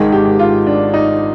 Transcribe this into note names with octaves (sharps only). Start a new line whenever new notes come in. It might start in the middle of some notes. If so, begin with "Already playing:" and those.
Already playing: G#1 G#2 D#3 G#4
G4
F4
D4
D#4